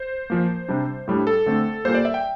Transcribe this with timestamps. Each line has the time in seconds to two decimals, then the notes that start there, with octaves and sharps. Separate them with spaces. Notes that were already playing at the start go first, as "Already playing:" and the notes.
Already playing: C5
0.30 A#2 F3 A#3
0.68 C3 G3 D4
1.07 A2 G3 D4
1.27 A4
1.46 D3 A3 C4
1.85 A#2 G3 A#3 C5
1.95 D5
2.05 E5
2.14 G5